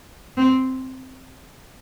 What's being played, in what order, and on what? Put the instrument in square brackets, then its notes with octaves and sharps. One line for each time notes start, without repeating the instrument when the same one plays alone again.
[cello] C4